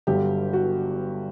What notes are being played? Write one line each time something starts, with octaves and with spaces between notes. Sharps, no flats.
G1 G2 D3 F#3 G4
F#4